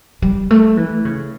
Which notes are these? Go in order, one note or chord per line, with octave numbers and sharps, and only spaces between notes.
G3
A3
E3
C#3